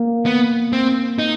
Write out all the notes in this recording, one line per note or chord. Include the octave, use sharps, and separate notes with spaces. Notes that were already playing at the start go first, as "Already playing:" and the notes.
Already playing: A#3
B3
C4
D#4